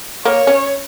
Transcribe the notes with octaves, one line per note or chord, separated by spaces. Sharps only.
A#3 C#5
C#4